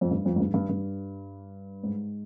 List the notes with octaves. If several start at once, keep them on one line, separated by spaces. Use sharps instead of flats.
F2
G2
F2
G#2
G2
G2
G2
G#2